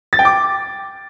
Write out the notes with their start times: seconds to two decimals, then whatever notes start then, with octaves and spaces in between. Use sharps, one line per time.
0.13 A6
0.19 G5
0.25 D6